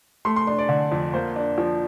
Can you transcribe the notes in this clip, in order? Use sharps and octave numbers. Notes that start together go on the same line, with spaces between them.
A3 C6
C6
D4 C6
D5
D3
F2
A#3 C5
D4
F3